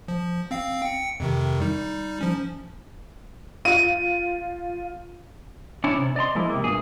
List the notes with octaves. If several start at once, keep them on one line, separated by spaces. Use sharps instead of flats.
F3
C4 F5 C7
G5 C#7
F2 C3 D#3
G3 D#4
F3 C#4
F4 D#7
C#4 D4 E4 C#5
C3
D5 D#5 A#5 C6
F3 G#3 A#3 E4
C3 A#3
G2 A#2 G#4